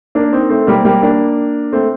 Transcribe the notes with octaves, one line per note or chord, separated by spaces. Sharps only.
A#3 D4
C4 D#4
A3 C4
G3 A#3
G3 A#3
A#3 D4
A3 C4